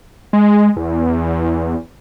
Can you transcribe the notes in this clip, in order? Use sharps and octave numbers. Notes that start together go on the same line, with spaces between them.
G#3
E2